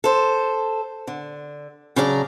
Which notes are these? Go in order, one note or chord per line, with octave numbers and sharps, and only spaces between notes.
A4 C5
D3
C#3 F#3 D4 D5 A#5